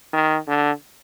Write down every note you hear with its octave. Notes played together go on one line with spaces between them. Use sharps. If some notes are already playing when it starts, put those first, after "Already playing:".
D#3
D3